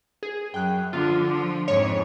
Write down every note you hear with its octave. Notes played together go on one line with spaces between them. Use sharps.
G#4
F#2 G5 F#6
D3 F3 F4
F3
F2 G#2 C#5